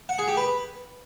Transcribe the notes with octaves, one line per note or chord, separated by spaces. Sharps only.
F#5
G#4
G4
B4